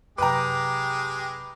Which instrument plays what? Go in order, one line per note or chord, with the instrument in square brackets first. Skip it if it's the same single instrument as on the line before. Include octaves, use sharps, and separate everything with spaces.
[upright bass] F#2 C3 [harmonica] G#3 G4 [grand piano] B4 A#5 [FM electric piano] G5 D6